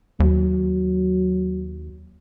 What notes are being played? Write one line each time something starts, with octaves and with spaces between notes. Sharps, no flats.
D#2 F#3